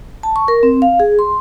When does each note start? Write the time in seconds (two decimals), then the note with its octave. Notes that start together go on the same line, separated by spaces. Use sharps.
0.23 A5
0.36 C#6
0.48 A#4
0.63 C4
0.82 F5
1.00 G#4
1.19 C6